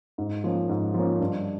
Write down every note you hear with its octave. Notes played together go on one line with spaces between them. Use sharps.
G#2
F3 A#3 C#4
G#2
F3 A#3 C#4
G2